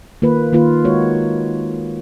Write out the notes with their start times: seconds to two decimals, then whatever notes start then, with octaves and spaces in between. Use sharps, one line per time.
0.22 D#3 A#3 F4 B4
0.53 D#3 A#3 F4 B4
0.85 G#3 D#4 F#4 C#5